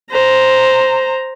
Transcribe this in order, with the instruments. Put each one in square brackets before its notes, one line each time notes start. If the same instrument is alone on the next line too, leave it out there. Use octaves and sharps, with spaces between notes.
[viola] C5 A#5